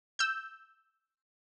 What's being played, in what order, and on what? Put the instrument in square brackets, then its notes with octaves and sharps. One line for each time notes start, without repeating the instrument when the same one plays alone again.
[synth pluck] E6 G6